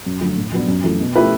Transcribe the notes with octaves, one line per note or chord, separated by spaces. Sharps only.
F#2
D3 F#3 A3
A2
F#3 B3 D4
F#2
E3 A3
B2
A3 E4 G4 B4